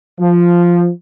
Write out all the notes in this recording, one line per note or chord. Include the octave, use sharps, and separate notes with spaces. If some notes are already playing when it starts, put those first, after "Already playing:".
F3